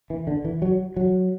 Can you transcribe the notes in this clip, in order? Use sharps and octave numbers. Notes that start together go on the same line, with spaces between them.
E3
D3
E3
F#3
F#3